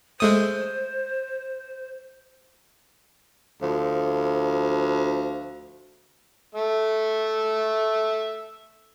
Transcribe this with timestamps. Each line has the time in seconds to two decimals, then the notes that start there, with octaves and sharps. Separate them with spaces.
0.20 G#3 A3 C5 D#6
3.62 D2 F3
6.55 A3 E5